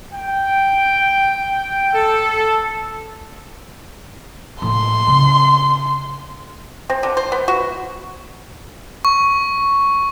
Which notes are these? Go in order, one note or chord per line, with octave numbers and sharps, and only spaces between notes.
G5
A4
A2 A#3 C6
C#3
C4
D3
C5
B3
F#4
C#6